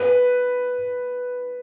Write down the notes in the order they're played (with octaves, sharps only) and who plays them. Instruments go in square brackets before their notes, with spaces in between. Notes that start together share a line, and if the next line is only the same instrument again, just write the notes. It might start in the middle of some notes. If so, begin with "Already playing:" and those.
Already playing: [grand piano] B4